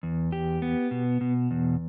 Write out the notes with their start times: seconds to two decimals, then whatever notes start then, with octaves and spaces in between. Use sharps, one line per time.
0.03 E2
0.32 G4
0.62 B3
0.91 B2
1.21 B2
1.51 E2